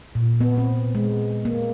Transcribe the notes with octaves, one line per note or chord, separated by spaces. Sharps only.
A#2
B3
C4
G#3
A#3